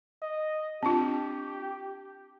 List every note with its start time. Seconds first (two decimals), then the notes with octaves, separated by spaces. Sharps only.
0.22 D#5
0.83 C4 D4 F4 G4